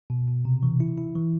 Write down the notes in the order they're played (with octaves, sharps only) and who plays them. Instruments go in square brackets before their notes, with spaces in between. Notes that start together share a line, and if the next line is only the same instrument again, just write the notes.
[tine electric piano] B2
B2
C3
E3
E4
E4
E3